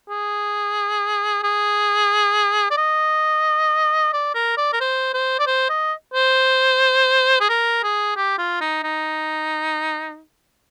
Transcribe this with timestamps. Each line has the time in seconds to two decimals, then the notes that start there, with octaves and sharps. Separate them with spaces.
0.10 G#4
1.44 G#4
2.71 D5
2.78 D#5
4.13 D5
4.35 A#4
4.57 D5
4.73 A#4
4.81 C5
5.14 C5
5.39 D5
5.47 C5
5.70 D#5
6.14 C5
7.41 G#4
7.49 A#4
7.83 G#4
8.17 G4
8.38 F4
8.61 D#4
8.84 D#4